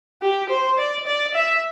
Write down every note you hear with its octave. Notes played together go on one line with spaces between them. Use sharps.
G4
C5
D5
D5
E5